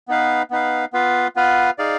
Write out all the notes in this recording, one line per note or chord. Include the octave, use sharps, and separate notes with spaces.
B3 D#4 B4 F5
B3 D#4 B4 F5
B3 F4 B4 F5
B3 F4 B4 F5
D#4 G#4 D5 F5